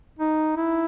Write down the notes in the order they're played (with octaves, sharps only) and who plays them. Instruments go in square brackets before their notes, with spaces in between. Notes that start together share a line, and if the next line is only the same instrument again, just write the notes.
[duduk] D#4
E4